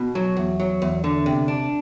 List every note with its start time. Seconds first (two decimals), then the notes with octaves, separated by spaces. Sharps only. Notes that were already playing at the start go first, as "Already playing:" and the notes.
Already playing: B2
0.15 F#3
0.37 E2
0.60 F#3
0.82 E2
1.04 D3
1.26 C3
1.48 D4